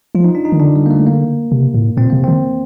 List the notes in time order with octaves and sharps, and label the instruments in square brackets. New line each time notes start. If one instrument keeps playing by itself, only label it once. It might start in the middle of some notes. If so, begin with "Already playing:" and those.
[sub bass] F3 [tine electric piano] F4
[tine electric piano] D#4
D4
D#4
[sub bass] D#3
[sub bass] D3 [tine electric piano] D4
[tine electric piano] G3
A#3
A3
A#3
[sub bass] C3
A2
[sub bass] A#2 [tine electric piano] C4
[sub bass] C3 [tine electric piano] A#3
[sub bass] D#3 [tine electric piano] C4